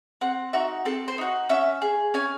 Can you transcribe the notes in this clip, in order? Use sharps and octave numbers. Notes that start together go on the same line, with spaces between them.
C4 F#5
D#4 F#4 E5
C4 A4
C5
D#4 F#4
C#4 E5
G#4
C#4 G#5